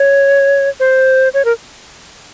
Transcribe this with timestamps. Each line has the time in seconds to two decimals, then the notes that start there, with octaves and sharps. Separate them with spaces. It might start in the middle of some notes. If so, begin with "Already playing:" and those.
Already playing: C#5
0.80 C5
1.34 C#5
1.45 A#4